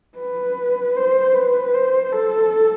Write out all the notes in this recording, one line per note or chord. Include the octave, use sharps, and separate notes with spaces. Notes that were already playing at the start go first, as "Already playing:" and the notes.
B4
C5
B4
C5
A4